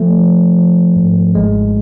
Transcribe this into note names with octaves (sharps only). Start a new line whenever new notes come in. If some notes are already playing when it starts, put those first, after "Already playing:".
Already playing: F3 A3
F3
F3
G#2
G#1 G#3